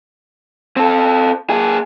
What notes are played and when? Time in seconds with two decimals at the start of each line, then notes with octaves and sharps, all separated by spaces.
0.77 C4 A4
1.50 A#3 G#4